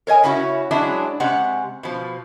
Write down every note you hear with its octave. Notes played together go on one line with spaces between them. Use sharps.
A#4 C#5 D#5 G#5
C#3 C#4 E4 F#4
F#3 G#3 C#4 D4 E4
C3 G#3 C#4 F#5
B2 F3